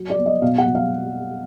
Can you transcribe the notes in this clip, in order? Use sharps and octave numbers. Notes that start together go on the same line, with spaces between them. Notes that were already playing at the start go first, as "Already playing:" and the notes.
Already playing: F#3
D5
B3
D#5
B2 F5
F#5
B2
F5